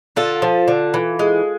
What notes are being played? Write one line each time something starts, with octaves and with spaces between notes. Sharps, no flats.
D3 F4 A4
F3
D3
E3
G#3